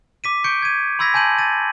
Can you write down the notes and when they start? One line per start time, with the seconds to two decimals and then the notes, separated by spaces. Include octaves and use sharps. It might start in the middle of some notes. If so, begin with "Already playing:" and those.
0.24 D6 B6 D#7
0.44 C#6 G6 C#7 D7
0.62 G#6 D#7
0.99 B5 C6 E6 G#6 A#6 B6
1.14 G#5 A5 G6 D#7 F#7
1.38 A6 D#7